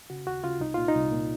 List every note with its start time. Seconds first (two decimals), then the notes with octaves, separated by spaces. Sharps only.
0.10 C#3 F#4
0.26 D#2 F#4
0.44 C#3 F4
0.60 C2 D#4
0.74 A#2 F4
0.88 D#4
0.95 C2
1.12 A#2